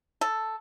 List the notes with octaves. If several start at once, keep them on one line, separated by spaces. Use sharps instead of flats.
A4